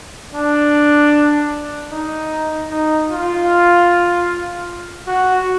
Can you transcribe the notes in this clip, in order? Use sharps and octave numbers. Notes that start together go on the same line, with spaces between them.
D4
D#4
D#4
F4
F#4